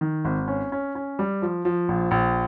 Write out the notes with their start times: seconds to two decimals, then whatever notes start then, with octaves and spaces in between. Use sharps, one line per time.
0.01 D#3
0.25 G#1
0.48 C#4
0.72 C#4
0.95 C#4
1.19 G3
1.42 F3
1.65 F3
1.88 A#1
2.11 A#1